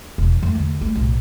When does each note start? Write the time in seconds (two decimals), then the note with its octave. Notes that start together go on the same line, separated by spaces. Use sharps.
0.18 E1
0.43 F2 A3
0.55 E2 D3
0.81 A3
0.95 B1 A2